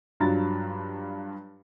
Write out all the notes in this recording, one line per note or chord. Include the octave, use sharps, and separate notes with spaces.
G2 F#3 D4 F4 A#5 A6